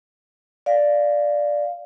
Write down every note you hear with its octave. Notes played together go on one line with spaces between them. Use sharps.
D5 F5